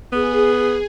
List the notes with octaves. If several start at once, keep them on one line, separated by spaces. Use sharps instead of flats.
B3 G#4